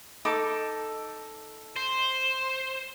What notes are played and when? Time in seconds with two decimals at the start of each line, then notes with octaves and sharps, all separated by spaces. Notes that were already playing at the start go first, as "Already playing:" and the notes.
0.25 D#4 A4 D6
1.76 C5